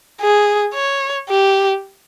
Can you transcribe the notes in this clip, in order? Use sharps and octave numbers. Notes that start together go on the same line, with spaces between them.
G#4
C#5
G4